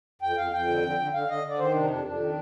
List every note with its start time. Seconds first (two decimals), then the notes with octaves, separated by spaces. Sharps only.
0.22 F2 G5
0.37 F2 F5
0.53 F2 G5
0.68 D3
0.83 D3
0.99 D3
1.13 D3 F5
1.28 D3 D#5
1.44 D3 D5
1.59 D#3 C5
1.74 C3 D4
1.83 D#4
1.89 F2 D4
2.05 F2 D4
2.20 D#3